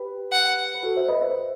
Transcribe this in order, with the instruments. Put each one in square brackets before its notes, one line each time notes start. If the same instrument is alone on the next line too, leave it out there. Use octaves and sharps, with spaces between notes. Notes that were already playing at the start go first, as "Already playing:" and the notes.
Already playing: [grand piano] G4 B4
[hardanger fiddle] F#5
[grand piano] B4
F#4 A4
C5 E5
B4 D#5
C5 E5